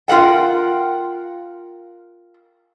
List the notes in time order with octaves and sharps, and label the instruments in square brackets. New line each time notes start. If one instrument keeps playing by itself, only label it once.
[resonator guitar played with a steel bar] F4 A#4 F#5 G5